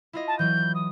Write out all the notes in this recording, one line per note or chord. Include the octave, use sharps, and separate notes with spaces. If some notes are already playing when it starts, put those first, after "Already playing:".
E4 F4 D#5
A5
E3 F#3 G6
D#6